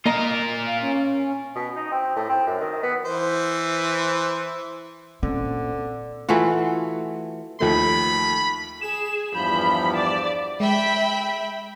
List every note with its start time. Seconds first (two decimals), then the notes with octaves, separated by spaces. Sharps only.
0.06 A#3 F4 A#4 D#5 A#5
0.66 F5
0.81 C#4
1.55 B2
1.76 D#4
1.92 C4
2.16 A2
2.29 C4
2.47 F#2
2.60 D#3
2.83 B3
3.05 E3 C5
5.23 A#2 D3 C4 C#4
6.29 E3 A3 F4 F#4
7.60 D#2 F3 A3 B5
8.81 G#4 E7
9.34 E2 G2 F3 B5 G6
9.94 D5 E7
10.60 G#3 E5 G5 B5